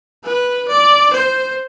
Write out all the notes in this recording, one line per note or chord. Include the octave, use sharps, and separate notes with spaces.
B4
D5
C5